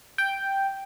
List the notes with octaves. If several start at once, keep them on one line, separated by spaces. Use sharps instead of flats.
G5